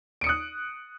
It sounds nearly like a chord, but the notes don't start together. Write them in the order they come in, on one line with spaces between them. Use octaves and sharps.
D7 C#7 D#6 F#6